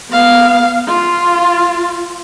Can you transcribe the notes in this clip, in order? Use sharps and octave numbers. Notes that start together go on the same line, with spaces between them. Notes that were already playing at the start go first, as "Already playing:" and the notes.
B3 F5
F4